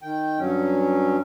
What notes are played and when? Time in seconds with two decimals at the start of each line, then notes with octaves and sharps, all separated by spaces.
0.02 D#3 G5
0.39 G2 F#3 C#4